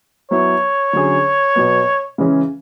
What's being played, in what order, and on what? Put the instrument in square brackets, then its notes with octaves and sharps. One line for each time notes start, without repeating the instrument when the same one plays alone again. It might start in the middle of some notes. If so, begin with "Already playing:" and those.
[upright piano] F#3 B3 E4 B4 [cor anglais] C#5
[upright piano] D3 F#3 C#4 G#4
B2 F#3 B3
C#3 E3 G#3 C#4